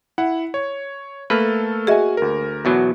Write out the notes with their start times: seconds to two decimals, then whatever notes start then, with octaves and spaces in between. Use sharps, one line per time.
0.18 E4 F#5
0.54 C#5
1.30 A3 A#3 A4 B4 F6
1.87 F#4 G#4 D#5 E5 G#5
2.17 D2 A#4
2.65 E2 B2 F#3